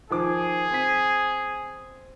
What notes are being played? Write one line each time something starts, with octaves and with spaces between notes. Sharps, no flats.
D#3 F3 G#4 D6
C4 B6